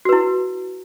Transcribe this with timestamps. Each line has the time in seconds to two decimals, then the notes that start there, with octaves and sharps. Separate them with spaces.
0.05 F#4
0.09 B4
0.13 E4